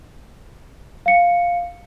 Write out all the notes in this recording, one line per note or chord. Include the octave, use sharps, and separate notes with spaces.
F5 C#7